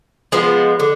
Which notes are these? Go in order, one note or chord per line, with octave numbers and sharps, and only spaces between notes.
F3 G#3 B3
D3